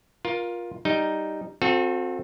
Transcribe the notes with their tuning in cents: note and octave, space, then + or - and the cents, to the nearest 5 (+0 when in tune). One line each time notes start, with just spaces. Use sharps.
F4 +10 A#4 +25
G3 +0 D#4 +0
C4 +0 F#4 -40 A4 +10